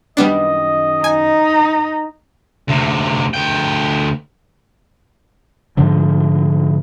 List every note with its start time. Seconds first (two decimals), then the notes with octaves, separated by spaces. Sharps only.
0.17 F#2 D#3 G3 B3 D4 D#5
1.04 D#4 G#5
2.68 D2 C3
3.34 D2 G5
5.77 G#2 D3 F3